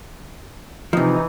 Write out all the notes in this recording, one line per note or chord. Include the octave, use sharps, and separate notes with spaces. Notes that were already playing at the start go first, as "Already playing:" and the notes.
C3 E3 F3 D#4